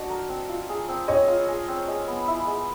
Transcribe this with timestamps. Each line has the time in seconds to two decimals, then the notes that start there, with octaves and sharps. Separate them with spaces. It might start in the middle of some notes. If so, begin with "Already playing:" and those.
Already playing: D4 F#4 D#5
0.10 A#4
0.29 C4
0.49 F4
0.69 G#4
0.89 C4
1.08 C4 C#5 D#5
1.28 F4
1.48 G#4
1.68 C4
1.88 G#3
2.08 B3
2.28 E4
2.47 G#3